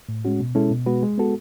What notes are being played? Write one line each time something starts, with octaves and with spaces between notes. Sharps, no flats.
A2
G#3 C#4 F#4
B2
G#3 C#4 E4 A4
B2
G#3 B3 F#4 B4
G#3
B3 F#4 A4